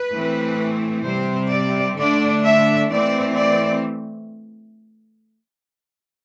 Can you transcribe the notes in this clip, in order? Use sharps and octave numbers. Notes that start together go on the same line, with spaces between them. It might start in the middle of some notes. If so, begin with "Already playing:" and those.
Already playing: B4
A2 E3 A3 C4
C3 G3 C4 C5
D5
D3 A3 D4 D5
E5
E3 A3 C4 D5
D5